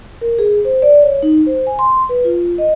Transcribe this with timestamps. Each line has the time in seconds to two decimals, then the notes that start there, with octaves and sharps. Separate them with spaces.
0.21 A#4
0.39 G#4
0.65 C5
0.82 D5
1.03 C#5
1.23 D#4
1.46 C5
1.67 G#5
1.79 C6
2.09 B4
2.25 F4
2.58 D#5